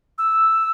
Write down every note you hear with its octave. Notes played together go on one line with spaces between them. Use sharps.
E6